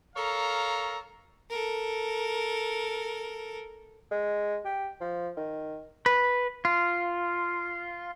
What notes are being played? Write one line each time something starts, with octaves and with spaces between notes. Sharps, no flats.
A4 A#4 C#5 F5 A#5
A4 A#4
G#3
G4
F3
D#3
B4
F4